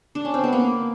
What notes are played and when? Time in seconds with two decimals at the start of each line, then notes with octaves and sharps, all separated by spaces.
0.15 D4
0.25 C#4
0.34 C4
0.44 B3
0.53 A#3